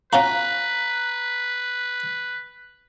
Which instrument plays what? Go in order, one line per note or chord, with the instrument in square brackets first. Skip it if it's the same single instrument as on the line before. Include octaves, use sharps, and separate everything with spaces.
[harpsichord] C#4 F4 F#4 [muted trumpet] B4 [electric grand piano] A#5